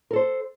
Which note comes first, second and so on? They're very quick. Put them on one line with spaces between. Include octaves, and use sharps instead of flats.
A#4 A4 C5